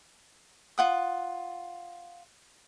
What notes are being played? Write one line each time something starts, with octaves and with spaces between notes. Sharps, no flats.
F4 F#5 D#6